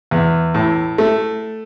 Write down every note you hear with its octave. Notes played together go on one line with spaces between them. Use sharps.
E2
A2
A3